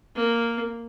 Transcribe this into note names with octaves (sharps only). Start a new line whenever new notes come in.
A#3